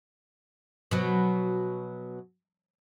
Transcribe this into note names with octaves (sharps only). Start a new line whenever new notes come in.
B2 F#3